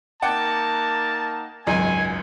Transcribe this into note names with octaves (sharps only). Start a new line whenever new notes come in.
A#3 D#4 F#5 G5 A5 D6
G#1 C#2 F#2 G#5